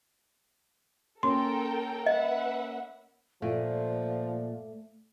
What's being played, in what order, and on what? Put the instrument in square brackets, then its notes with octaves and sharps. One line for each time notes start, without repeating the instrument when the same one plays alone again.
[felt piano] A#3 C#4 [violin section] A4 A#4 G5 [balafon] C6
[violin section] B4 E5 F#5 [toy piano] D#5
[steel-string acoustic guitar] A#2 [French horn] F3 [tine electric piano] A3 [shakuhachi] D5